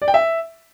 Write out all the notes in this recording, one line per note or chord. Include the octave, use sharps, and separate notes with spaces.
D5
G5
E5